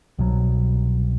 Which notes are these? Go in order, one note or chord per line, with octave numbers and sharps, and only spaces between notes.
C2 B2 F#3